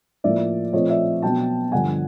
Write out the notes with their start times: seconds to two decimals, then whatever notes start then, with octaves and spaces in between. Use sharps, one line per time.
0.24 A2 F3 A#3 D5 E5
0.73 A#2 F3 A3 C4 C#5 D#5
0.90 D5 E5
1.22 B2 F#3 B3 G5 A5
1.72 G2 D3 F3 F#5 G#5